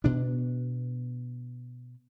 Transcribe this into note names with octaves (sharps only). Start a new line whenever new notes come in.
B2 B3 D4